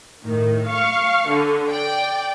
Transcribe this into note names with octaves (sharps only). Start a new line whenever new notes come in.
A2 D#3
F5 C#6
D3
D5 G5